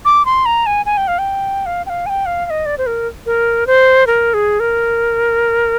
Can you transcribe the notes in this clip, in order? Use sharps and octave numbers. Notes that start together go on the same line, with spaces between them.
D6
C6
A#5
G#5
G#5
G5
F5
G5
F5
G5
F5
G#5
G5
F5
F5
D#5
D5
C5
A#4
A#4
C5
A#4
G#4
A#4